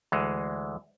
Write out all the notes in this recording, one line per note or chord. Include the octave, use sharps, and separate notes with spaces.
D2 E3 G#3